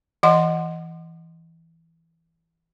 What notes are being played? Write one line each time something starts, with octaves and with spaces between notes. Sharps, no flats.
E3 D#5 F#5 C6